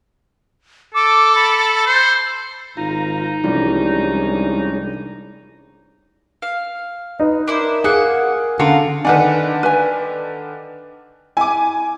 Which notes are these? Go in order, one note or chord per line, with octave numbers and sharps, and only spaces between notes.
A4 D6
B5
C5
G#1 D#4 F4 A#5
C2 E3 F3 G3 G#3 C#4 D4
F5
D#4 B4
D4 E4 A#4 C5
A#3 G#4 F#5
D3 C#4 F4 F#4 A#4
D3 D#3 D4 B4 F#5 G#5
B4 G#5
E4 G#5 D6